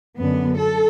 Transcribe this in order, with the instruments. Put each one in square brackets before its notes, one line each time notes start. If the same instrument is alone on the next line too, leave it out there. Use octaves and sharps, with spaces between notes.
[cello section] F#2 D3 B3
A4